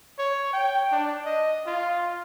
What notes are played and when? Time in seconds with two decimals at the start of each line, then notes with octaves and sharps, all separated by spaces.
0.19 C#5
0.53 G5
0.92 D4
1.26 D#5
1.67 F4